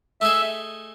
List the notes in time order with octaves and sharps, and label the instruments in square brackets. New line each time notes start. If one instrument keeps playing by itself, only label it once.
[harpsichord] A3 D#4 G#4 [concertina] E5